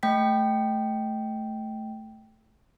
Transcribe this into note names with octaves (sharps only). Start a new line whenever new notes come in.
A3 G5 B6